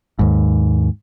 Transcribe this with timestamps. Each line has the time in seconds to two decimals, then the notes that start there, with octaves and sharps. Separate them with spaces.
0.19 D#2 G#2